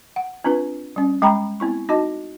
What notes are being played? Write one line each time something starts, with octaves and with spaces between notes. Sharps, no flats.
F#5
C4 D4 F4 B4
G3 C#4
G#3 G5 A#5 B5
B3 C4 E4 C#6
D#4 F#4 D#5 A5